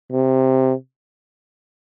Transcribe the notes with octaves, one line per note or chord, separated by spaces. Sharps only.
C3